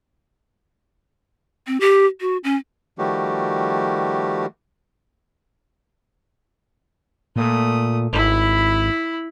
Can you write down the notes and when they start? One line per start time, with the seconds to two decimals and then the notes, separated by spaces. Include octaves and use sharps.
1.67 C4
1.80 G4
2.21 F#4
2.44 C#4
2.98 D#3 F3 G3 A3 F#4 G4
7.36 A#2 A3 D#6
8.13 G#1 E4 B5